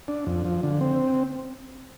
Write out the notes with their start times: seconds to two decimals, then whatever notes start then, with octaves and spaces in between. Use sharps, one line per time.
0.08 D4
0.26 F2
0.45 F3
0.63 D3
0.81 C4